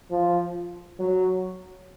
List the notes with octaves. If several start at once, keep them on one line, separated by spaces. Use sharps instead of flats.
F3
F#3